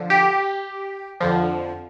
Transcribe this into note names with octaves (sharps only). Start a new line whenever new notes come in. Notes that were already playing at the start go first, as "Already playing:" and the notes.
Already playing: D3 F3
G4
F2 D3 F3